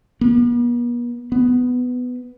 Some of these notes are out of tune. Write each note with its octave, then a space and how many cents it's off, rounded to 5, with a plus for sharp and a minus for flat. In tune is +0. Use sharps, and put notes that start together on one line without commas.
B3 -45
B3 +10